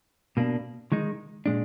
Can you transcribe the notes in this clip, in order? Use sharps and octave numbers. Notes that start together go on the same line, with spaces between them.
B2 A#3 D4
D#3 G#3 D#4
A#2 G#3 D4